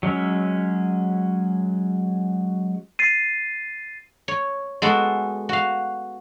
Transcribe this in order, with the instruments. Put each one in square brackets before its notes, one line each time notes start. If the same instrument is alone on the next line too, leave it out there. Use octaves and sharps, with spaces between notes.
[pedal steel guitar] F#3 G#3 C#4 E5
[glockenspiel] A6 C7 D#7
[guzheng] C#5
G#3 B3 F#4 A4
F#4 F5